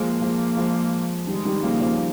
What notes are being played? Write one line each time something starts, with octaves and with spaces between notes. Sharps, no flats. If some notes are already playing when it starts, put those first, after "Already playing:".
Already playing: F3 G#3 A#3
F3 G#3
F3 G#3
D#3 G3 G#3
D#3 G3
C#3 F3 A#3
C#3 F3